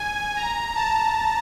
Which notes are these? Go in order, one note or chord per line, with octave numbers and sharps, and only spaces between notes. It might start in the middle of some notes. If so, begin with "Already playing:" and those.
Already playing: G#5
A#5
A5